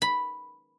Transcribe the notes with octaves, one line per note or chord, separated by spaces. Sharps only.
B5